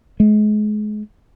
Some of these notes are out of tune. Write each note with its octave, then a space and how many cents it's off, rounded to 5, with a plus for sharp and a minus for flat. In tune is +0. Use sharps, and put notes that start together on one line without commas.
G#3 +30